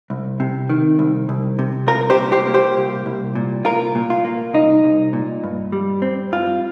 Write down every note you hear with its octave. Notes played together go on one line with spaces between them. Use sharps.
C2
C3
D#3
C2
C2
C3
C2 F4 A#4
G4 C5
A#2
G4 C5
A#3
G4 C5
C2
C2
A#2
C2 F4 A#4
A#2
F4
A#3
C2 D#4
C2
A#2
G2
G3
C4
G2 F4